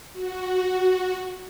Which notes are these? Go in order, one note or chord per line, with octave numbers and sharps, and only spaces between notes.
F#4